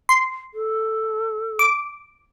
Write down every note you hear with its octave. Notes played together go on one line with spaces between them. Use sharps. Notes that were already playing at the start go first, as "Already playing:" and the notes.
C6
A4
D6